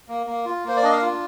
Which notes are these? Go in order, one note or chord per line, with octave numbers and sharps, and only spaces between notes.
A#3
A#3
F4
A#3 C5
D5
D4 D#5
F5
F4